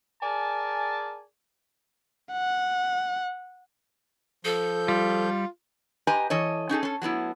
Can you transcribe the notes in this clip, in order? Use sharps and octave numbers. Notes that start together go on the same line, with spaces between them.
G#4 A#4 D5 G#5 A5
F#5
F3 A4 G6
G3 F4
G4 B4 D#5 G#5 A#5
E3 A4 C#5 D#5
C#4 D#4 G#4 A4
C#4 A4
F#3 A3 B3 E4